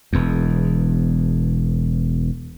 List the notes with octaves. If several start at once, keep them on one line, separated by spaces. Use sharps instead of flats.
E1 E2